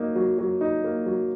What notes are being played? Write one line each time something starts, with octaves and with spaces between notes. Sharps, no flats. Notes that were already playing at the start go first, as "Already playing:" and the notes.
Already playing: F#3 A#3 D#4
F#3
F#3
D#4
A#3
F#3